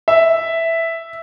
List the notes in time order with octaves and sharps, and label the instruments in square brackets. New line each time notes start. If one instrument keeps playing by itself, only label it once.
[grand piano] E5